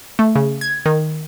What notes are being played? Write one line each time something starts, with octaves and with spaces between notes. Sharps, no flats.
A3
C#3
G#6
D#3